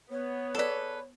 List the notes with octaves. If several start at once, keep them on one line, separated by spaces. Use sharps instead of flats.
B3 C#5
G#4 A4 B4 D5